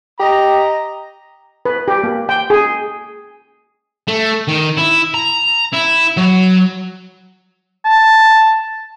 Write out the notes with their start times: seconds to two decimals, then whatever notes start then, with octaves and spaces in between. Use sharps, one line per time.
0.20 G4 D#5 A#5
1.65 B4
1.88 G4
2.04 A#3
2.29 G5
2.50 G#4
4.08 A3
4.48 D#3
4.78 E4
5.14 A#5
5.72 E4
6.17 F#3
7.85 A5